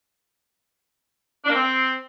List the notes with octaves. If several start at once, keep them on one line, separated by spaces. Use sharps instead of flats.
D4
A#3
C4